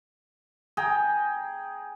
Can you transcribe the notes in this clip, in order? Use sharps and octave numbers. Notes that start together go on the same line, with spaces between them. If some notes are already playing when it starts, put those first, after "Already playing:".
G#4 G5 A#5